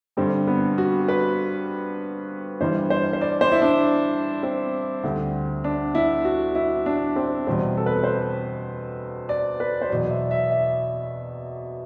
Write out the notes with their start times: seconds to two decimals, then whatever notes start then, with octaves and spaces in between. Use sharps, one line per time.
0.17 G2 D3 G3 C4
0.47 B3
0.78 F#4
1.08 B4
2.61 G2 E3 G3 C5
2.90 C5
3.13 C5
3.21 D5
3.41 C5
3.52 E4
3.62 D4
4.43 C4
5.03 D2 D3 G3
5.64 D4
5.95 E4
6.25 F#4
6.55 E4
6.86 D4
7.16 C4
7.47 E2 B2 G3 C4
7.77 A4
7.86 B4
7.96 A4
8.03 C5
8.07 B4
9.29 D5
9.60 B4
9.82 C5
9.89 E2 B2 F#3 D5
10.10 E5
10.31 E5
10.51 E5